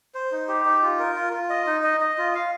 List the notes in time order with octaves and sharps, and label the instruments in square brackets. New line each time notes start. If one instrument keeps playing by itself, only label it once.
[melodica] C5
D#4
G4
D#4
F4
A#4
F4
F4
D#5
D#4
D#5
D#5
F4
F5